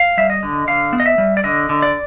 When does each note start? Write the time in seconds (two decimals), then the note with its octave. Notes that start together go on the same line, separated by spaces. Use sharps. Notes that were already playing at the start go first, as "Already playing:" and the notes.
Already playing: F5
0.17 G3 E5
0.30 D#5
0.43 D3
0.67 D3 F5
0.93 B3
1.00 D#5
1.06 E5
1.18 G3
1.37 D5
1.44 D3 D#5
1.69 D3
1.82 D5